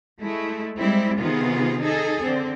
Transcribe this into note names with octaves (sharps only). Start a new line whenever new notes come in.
G#3 A3 E4
G3 G#3 C4 E4
C3 D#3 B3 F4 G#4
D#4 G#4 A4
D3 C4